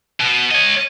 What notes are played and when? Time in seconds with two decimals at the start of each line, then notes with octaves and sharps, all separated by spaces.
0.20 B2
0.51 C#5 D#5